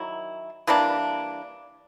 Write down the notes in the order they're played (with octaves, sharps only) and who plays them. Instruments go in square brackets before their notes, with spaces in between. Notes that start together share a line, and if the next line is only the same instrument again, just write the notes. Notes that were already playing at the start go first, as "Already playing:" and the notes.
Already playing: [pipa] D#3 F#3 E4
E3 G3 A#3 D4